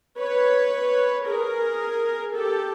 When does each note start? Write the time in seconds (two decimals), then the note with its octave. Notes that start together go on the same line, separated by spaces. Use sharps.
0.19 B4 C#5
1.27 G#4 A#4
2.36 G4 A4